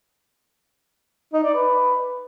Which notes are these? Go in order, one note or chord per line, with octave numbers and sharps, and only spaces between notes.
D#4
D5
B4